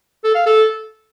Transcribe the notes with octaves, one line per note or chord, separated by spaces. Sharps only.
A4
F5
A4